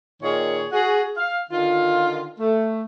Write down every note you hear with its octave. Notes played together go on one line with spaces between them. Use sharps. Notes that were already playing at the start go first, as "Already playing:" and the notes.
A#2 D#3 G#4 C#5
F#4 G#4
F5
D3 D#3 F4
A3